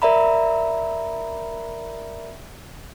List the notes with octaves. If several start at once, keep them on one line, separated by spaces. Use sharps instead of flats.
A#4 D5 E5 A#5 B5